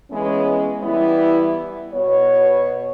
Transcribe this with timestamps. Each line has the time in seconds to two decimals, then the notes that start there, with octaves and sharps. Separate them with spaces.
0.11 E3 G#3 B3 C#4
0.83 E3 G3 B3 E4
1.93 B2 C#5